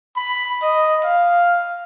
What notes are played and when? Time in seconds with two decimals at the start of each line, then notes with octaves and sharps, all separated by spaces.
0.16 B5
0.63 D#5
1.04 F5